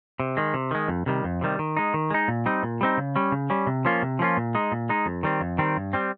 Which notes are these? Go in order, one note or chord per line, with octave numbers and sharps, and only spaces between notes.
C3
D#3 G#3
C3
D#3 G#3
F2
C3 D#3 G3
F2
C3 D#3 G3
D#3
G#3 D#4
D#3
G#3 D#4
A#2
G3 C4 D#4
A#2
G3 C4 D#4
C#3
G3 C#4
C#3
G3 C#4
C3
F3 A#3 C#4 F4
C3
F3 A#3 C#4 F4
A#2
G#3 D#4
A#2
G#3 D#4
F2
D#3 G3 C4
F2
D#3 G3 C4
G2
G3 C4